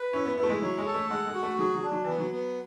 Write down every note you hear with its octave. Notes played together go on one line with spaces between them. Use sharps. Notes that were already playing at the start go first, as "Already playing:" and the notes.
Already playing: B4
C#4 E4
B3
B3 E4
A3
G#3
F#3 C#5
G#3
A4
A3
G#3 F#5
G#3
F#4
A3
F#3 G#4
F#3
D4
F#3
E3 B3
F#3
B3